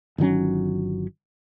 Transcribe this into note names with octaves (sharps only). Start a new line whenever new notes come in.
G1 D#3 F#3 C#4